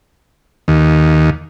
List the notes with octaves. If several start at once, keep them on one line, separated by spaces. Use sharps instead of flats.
D#2